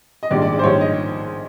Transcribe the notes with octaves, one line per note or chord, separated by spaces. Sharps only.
D#5
A#1 G#2 D#3 G3 D5
D5
D5
C5
A#1 G#2 D#3 G3 C#5
D#5